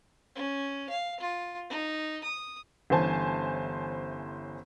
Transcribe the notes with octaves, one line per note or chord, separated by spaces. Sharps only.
C#4
F5
F4
D#4
D#6
G1 E3 C#4 C5 G#5 A5